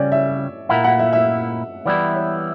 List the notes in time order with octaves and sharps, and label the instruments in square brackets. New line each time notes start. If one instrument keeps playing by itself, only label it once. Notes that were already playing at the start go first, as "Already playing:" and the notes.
Already playing: [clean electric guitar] C#3 G3 C#4 [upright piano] C#5 D5
[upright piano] E5
[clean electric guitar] A#2 A#3 E4 [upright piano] F#5
[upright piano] F#5
E5
E5
[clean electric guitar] E3 G3 B3 E4 [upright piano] D5
[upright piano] C#5